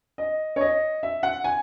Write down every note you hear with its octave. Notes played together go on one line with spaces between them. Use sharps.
D#5
C#5
D#5
E5
F#5
G#5